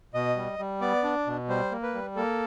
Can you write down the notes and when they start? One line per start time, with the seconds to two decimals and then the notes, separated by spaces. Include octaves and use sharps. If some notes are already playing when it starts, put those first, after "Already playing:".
0.14 B2 D#5
0.36 G3
0.59 G3
0.81 B3 D5
1.03 D4
1.27 B2
1.49 G3 C5
1.72 A#3
1.83 B4
1.94 G3
2.16 A#3 A4